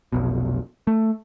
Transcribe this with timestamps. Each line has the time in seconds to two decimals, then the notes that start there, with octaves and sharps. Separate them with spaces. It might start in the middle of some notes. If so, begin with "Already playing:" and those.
0.12 F1 B1 B2
0.87 A3